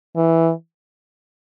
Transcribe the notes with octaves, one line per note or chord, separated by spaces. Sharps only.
E3